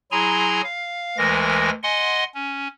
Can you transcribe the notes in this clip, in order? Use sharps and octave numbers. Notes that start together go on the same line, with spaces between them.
F#3 E4 G#4 G#5 A#5 C6
F5
D2 E3 G#3 A#4 A#6
D#5 F#5 G#5 C6
C#4